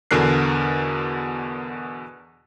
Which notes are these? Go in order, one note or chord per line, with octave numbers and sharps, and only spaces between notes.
E2 B2 D3 A#4 F#6 C7